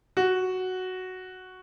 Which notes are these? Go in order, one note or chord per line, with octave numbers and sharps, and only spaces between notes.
F#4